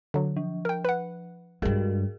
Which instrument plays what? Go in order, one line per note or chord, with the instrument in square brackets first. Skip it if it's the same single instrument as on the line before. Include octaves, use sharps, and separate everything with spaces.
[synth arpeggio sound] D3 F#3
[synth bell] F3
[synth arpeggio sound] A#4 G5
B4 F#5
[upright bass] G2 G#3 [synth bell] F#4 G#4 A#4